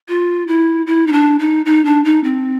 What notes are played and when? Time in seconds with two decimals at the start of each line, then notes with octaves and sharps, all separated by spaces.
0.08 F4
0.48 E4
0.87 E4
1.07 D#4
1.13 D4
1.39 D#4
1.66 D#4
1.85 D4
2.05 D#4
2.24 C4